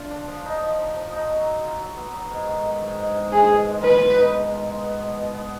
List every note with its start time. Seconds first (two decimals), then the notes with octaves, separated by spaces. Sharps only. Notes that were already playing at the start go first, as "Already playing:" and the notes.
Already playing: D3 F4
0.10 D4
0.28 F3
0.45 D#4
0.61 F3
0.78 F3
0.96 F3
1.12 D#4
1.29 F#3
1.46 F#3
1.63 F4
1.80 F#3
1.97 B3
2.14 F#3
2.31 G#2
2.47 D#3
2.65 D#3
2.82 G#2
2.98 G#2
3.15 G#2
3.32 G#3 G#4
3.48 B2
3.66 G#3
3.83 B2 B4
3.99 B2
4.16 D#4
4.34 B2
4.51 F4
4.67 G#3
4.84 B3
5.01 B2
5.18 B2
5.34 B3